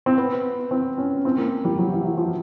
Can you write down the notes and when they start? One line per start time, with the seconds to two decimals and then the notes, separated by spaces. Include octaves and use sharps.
0.06 C4
0.18 B3
0.71 C4
0.98 C#4
1.25 C4
1.38 A#3
1.65 G3
1.78 F#3
1.92 E3
2.04 E3
2.17 F3